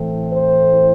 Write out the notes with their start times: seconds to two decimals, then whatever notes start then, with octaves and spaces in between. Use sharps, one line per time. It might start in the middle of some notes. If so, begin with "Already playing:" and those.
Already playing: A2 E3 A3 C4
0.31 C5